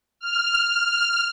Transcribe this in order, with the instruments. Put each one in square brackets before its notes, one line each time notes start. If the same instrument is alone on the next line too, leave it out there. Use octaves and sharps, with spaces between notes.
[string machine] F6